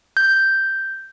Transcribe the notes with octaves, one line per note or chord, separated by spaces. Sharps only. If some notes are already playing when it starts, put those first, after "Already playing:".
G6